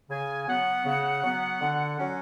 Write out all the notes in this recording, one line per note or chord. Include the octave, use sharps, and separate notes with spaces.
C#3 G#5
F#3 B3 F#5
C#3
F#3 B3
D3
F#3 C#4